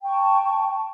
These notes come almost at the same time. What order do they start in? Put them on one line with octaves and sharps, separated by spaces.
G5 C#6 A5